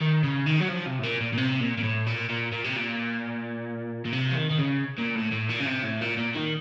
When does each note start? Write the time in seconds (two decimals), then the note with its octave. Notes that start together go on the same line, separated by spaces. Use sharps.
0.01 D#3
0.24 C#3
0.46 D#3
0.60 F#3
0.69 F3
0.86 C3
0.99 A2
1.03 A#2
1.21 A#2
1.33 A#2
1.37 C3
1.60 A#2
1.78 A#2
1.83 A2
2.06 A#2
2.29 A#2
2.52 A#2
2.64 C3
2.76 A#2
4.05 A#2
4.12 C3
4.31 F3
4.35 D#3
4.50 D#3
4.58 C#3
4.98 A#2
5.15 A2
5.32 A2
5.50 A#2
5.61 C#3
5.67 C3
5.84 A2
6.01 A#2
6.18 A#2
6.35 D#3